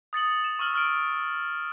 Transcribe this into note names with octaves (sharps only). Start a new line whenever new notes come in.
D#6 A6 C#7 F#7
E7
C#6 E6 F6 F#7
C#6 F6 D7